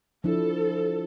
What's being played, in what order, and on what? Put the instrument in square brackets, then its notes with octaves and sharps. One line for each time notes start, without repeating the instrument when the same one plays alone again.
[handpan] F3 D4 E4 [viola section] A4